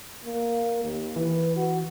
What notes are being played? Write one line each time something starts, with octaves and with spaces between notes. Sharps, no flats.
A#3
D#2
E3 B4
F#4